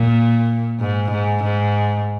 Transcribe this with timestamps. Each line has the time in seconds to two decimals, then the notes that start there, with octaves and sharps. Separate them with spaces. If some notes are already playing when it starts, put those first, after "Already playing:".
Already playing: A#2
0.80 G#2
1.11 G#2
1.43 G#2